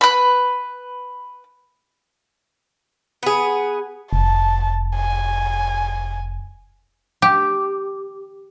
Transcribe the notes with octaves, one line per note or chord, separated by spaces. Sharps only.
B4 B5
B3 G#4
F1 A5
G#5
G4